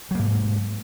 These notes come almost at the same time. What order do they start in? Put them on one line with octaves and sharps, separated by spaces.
F#3 A#3 G#2